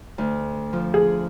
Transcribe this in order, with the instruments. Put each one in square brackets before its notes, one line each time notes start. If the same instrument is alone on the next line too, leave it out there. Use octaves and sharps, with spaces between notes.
[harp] D2
F3
[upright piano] G#4